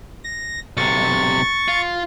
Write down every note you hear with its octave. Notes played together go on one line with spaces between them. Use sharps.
A#6
B1 C3 C#6 A6
F4